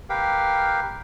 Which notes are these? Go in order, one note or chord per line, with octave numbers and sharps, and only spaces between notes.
G4 A#4 B4 F5 G5